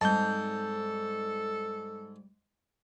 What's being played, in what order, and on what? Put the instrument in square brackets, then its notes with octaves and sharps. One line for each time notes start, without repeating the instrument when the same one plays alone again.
[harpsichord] G#2 [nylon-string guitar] G3 C4 D#4 [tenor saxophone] A4 [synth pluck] A5 G6